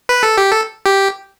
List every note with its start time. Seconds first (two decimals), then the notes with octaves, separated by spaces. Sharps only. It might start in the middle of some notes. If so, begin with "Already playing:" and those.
0.09 B4
0.23 A4
0.37 G4
0.51 A4
0.86 G4